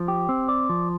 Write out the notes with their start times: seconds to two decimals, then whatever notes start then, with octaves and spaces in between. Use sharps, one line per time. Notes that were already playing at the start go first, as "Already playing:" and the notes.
Already playing: F3
0.08 G4
0.29 C4
0.48 D5
0.69 F3